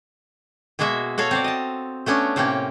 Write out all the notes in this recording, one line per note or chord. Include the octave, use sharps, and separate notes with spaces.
B2 G#3 A#3 F#4 E5
F#4 A4 C#5 F5
C4 C5 D5
D#5 A5
A3 B3 C#4 D4
A2 C3 A#3 C#4 G5